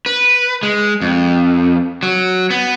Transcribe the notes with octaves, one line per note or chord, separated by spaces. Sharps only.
B4
G#3
F2
F#3
B3